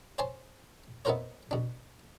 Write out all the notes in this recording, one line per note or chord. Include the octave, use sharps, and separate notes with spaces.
C5 C#5 G#5 A5 C6
B3 D#4 E4 A#4 C5 C#5
B2 D4